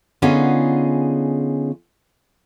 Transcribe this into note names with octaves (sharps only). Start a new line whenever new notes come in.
D3 B3 C#4 D#4 F4 G#4